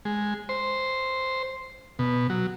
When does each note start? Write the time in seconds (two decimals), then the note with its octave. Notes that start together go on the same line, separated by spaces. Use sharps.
0.05 G#3
0.49 C5
1.99 B2
2.30 F#3